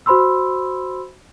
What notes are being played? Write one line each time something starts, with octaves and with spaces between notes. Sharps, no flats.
F#4 C5 B5 C6 E6